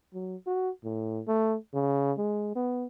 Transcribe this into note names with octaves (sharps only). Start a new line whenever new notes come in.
F#3
F#4
A2
A3
C#3
G#3
B3